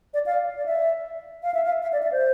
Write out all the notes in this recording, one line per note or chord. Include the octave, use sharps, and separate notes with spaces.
D5
F5
D5
E5
F5
E5
F5
E5
D5
E5
C5